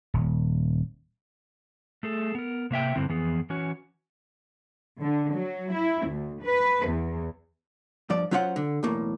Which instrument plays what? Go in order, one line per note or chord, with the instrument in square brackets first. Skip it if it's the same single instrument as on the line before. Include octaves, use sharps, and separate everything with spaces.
[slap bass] D#1
[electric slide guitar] A3 G#4 A4
B3 A#4
C3 A#3 E5 G5
G2 D3 C4 E4
F2 E3 B3 G#4
E3 C#4 F#4 C#5
[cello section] D3
F#3
E4
D2
B4
E2
[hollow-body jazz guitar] G2 F3 D5
F#3 C#4 F4 C5 D#5 F#5
D3
B1 E2 A2 A#3